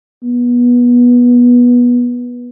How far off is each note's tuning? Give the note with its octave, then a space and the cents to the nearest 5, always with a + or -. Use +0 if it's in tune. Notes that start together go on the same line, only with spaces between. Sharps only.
B3 -20